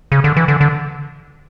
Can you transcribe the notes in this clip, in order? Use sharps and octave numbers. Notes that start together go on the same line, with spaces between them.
C#3
D3
E3
D3
D3